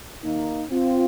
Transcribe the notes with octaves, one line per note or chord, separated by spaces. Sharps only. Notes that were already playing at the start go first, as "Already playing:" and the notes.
D#2 D#3 A#3 D#4
C4 F4